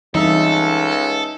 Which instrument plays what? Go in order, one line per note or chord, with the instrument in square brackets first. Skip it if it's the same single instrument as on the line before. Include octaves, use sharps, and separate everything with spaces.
[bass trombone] C#2 [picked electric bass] E3 G3 C4 [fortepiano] D#4 E5 [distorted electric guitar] A4